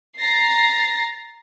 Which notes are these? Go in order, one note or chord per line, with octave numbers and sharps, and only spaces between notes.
A#5 A6 A#6 C7